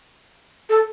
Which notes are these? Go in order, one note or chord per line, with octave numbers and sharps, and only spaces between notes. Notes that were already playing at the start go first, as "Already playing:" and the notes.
A4